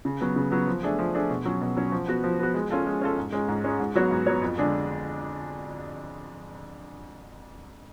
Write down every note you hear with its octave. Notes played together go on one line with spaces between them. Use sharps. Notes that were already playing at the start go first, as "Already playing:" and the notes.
C#3
F#3 B3
C#3
F#3 B3
F3
A3 D4 G#4
F3
A3 D4 G#4
B2
F#3 C#4
B2
F#3 C#4
F3
B3 F#4
F3
B3 F#4
G#3
C#4 F4 A4
G#3
C#4 F4 A4
G#2
G#3 C#4
G#2
G#3 C#4
G#2
F#3 B3 F#4 C#5
G#2
F#3 B3 F#4 C#5
F2
D3 G#3 D4 G#4